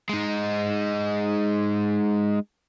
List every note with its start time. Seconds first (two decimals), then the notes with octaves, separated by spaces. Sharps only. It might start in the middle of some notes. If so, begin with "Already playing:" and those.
0.09 G#3 D#4